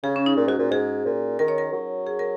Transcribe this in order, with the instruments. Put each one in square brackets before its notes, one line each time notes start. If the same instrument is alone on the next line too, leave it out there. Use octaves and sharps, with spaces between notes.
[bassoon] C#3 [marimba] G#4
[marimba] C#4
D#4
[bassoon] A#2
[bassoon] G#2 [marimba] F#4
[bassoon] A#2
[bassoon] G#2 [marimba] G#4
[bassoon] A#2
[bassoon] D#3 [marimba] A#4
[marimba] C#5
A#4
[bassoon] F#3
[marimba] G#4
A#4